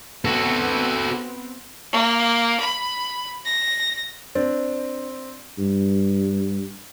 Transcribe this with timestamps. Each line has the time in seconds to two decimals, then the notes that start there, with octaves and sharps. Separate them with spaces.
0.25 B3 C4 F#4 A4
1.92 A#3
2.60 B5
3.46 A#6
4.35 C4 D4
5.58 G2